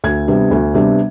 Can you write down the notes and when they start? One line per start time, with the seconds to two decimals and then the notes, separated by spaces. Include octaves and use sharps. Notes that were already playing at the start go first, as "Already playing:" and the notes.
0.04 D2 G#6
0.28 C3 G3 B3 D4
0.51 D2
0.74 C3 G3 B3 D4